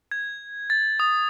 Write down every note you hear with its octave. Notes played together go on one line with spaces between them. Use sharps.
G#6
A6
D#6